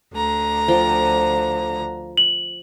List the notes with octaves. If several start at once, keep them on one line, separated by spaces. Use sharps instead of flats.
D2 D3 A#5
F3 F5 G5
F#7